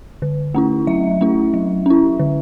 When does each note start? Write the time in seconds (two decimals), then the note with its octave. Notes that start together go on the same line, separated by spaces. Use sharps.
0.22 D3
0.54 A3 C#4 E4
0.87 F#3 E5
1.21 A3 C#4 E4
1.54 F#3
1.86 C#4 E4
2.19 D3